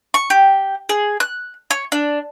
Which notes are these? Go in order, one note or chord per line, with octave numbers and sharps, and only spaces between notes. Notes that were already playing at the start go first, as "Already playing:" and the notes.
C#6
G4
G#4
F#6
C#5
D4